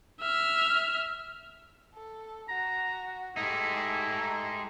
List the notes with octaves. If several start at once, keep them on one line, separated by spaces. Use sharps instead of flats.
E5 F6
A4
F#4 A#5
G#3 A3 D#4 E4 G4